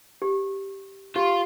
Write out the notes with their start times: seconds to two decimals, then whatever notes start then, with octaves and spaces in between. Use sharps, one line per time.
0.22 G4
1.16 F4 G4